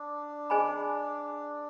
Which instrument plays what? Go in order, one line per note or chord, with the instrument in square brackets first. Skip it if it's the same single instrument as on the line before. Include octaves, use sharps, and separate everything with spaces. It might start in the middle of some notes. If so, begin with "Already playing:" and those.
Already playing: [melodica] D4
[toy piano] G#4 C5 D#5 G#5 B5